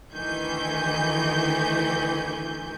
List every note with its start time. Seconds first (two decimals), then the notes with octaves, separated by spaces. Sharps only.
0.14 D2 D#3 E3 G#5 G6